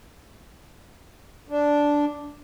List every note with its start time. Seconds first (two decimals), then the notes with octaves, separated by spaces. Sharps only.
1.48 D4